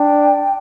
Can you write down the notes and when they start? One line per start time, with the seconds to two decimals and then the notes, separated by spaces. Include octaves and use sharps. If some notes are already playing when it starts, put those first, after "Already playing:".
Already playing: D4 G5